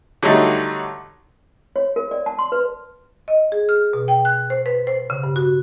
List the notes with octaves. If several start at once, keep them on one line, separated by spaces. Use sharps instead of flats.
D3 F#3 G3 A3 D#4
C#5
A#4
D5
A5
C6
B4
D#5
G#4
F6
B2
G5
F#6
C5
B4
C5
C#3
G2
F#4